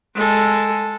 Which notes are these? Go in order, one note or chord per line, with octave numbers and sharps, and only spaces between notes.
G#3 A4